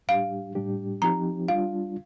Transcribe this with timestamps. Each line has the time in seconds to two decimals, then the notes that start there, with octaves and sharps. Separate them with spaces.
0.08 A2 G3 D4 G4 F5
0.55 A2 G3 D4 G4
1.02 F3 C4 D#4 G4 A#5
1.48 G3 D4 F4 F5